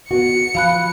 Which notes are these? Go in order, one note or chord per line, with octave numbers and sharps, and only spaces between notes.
B3 F#4 C#7
F3 F5 B5 F#6